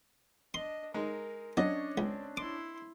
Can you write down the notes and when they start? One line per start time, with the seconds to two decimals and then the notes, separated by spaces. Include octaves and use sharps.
0.54 D4 D#5 C6
0.94 G#3 D#4 A#4
1.57 F#3 C#4 D4 C#5 D#5
1.98 C#2 C4
2.37 E4 C6 D6